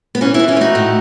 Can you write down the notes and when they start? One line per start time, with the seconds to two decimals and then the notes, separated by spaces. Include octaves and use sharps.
0.15 B3
0.21 E3 C#4
0.34 E4 G#4
0.39 E3
0.48 C#4 E4
0.57 A3 D#4 F#4
0.75 A2